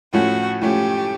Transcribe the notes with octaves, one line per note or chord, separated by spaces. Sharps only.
A2 F3 A3 C#4 F#4
A2 F3 A3 C#4 G4